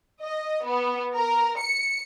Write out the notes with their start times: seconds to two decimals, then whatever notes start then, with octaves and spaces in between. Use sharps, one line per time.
0.22 D#5
0.66 B3
1.15 A#4
1.59 C#7